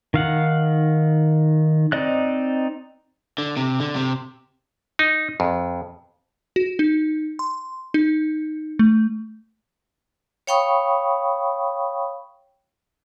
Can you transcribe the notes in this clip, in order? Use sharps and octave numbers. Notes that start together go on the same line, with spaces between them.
D#3 F5 F#5
C4 D#4 D5 D#5 F#6
D3
C3
D3
C3
D#4
F2
F#4
D#4
C6
D#4
A3
C#5 F5 G5 B5 C#6 D#6